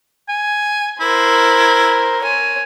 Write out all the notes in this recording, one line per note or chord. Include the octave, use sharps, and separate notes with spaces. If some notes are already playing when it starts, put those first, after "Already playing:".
G#5
E4 A#4 C5
C#5 G#5